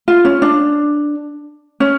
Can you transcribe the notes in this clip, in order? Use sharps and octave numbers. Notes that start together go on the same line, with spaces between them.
F4
C#4
D4
C#4